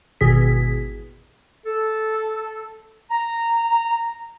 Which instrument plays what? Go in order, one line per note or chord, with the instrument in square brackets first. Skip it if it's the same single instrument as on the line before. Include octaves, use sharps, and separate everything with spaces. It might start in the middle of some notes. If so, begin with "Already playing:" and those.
[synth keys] G#1 E2 B2 G#4 B6
[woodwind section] A4
A#5